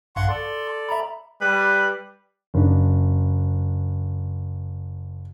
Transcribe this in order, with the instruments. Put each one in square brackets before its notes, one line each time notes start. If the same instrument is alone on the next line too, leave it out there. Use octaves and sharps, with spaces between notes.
[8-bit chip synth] A#1 G2 F5 [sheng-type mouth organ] F#5 C6 C#6
[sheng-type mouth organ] A4 D5 [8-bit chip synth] C6
[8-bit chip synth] E5 A#5 B5
[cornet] G3 [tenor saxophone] B4
[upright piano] F#1 D4